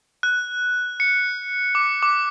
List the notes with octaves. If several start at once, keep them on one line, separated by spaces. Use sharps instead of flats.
F#6
C#7
D6
D6